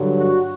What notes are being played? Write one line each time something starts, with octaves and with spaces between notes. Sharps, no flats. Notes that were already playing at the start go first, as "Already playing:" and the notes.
Already playing: G2 D3 F#3
F#4